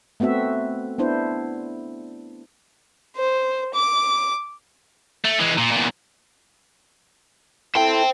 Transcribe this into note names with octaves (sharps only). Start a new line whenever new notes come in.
A3 B3 C4 F#4 E5
B3 D4 E4 C5
C5
D6
A3
E3 G#3
A#2
E2 A#2
E4 A4 C5 G5